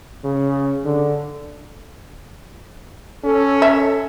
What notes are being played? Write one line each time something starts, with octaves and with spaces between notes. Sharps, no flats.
C#3
D3
C#4 A4
E5